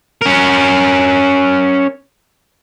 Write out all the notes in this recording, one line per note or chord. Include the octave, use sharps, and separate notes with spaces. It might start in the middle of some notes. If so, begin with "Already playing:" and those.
C#4 A#4